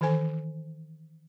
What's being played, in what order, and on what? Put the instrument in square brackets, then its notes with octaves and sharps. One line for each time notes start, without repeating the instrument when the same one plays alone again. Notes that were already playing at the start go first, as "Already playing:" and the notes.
[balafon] D#3 E3 A4 C5 G#5